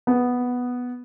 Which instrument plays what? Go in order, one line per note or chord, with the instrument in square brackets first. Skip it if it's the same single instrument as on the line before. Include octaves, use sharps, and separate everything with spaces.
[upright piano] B3